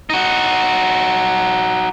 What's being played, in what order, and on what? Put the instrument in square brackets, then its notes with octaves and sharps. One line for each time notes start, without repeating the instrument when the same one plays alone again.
[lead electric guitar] D#4 F#4